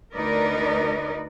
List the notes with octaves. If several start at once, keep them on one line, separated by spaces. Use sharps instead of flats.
D2 D#4 A#4 B4 D5 D#5